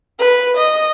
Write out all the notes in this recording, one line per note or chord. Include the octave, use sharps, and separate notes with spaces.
B4
D#5